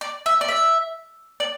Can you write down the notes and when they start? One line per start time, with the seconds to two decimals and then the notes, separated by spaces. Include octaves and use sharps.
0.01 D5
0.26 E5
0.41 D5
0.48 E5
1.40 D5